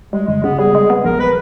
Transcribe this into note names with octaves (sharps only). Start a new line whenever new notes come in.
G3 G#3
G1 G#3
C#3 B3
G3 G#4
G#3
B3
A#1 A#4
B4